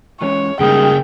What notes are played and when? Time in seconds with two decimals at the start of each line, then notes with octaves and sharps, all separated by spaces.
0.21 E3 G#3 C#4 C#5
0.60 C#3 G3 G#3 A#3 D#4 G#4 G5